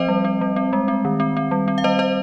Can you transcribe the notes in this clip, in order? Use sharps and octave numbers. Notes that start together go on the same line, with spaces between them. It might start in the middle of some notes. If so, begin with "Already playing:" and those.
Already playing: F3 C4 C5 D#5
G3
C4
G3
C4
G#3
C4
D#3
C4
C4
G3
C4
F5
G3 C5 D#5
G3 C5 D#5